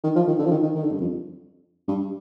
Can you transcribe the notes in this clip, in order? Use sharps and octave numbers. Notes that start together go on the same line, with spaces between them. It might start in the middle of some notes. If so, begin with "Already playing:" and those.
D#3
F3
D#3
D3
F3
D#3
D#3
D#3
D3
G2
F2
G2